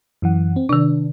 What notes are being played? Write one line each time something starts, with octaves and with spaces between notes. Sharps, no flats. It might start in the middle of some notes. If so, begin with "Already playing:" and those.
F#2 E3 F#5
C4
C3 D#3 D4